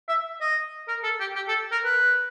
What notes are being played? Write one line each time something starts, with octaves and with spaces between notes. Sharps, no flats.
E5
D#5
A#4
A4
G4
G4
A4
A#4
B4